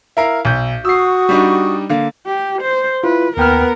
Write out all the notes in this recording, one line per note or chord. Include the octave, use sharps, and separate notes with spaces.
E4 A#4 F5
B1 G6
F#4 C#6 D#6 E6 C7
G3 D4 D#4
D3 A#3
G4
C5
E4 F4 B4
D#2 B3 A#4 G5 F6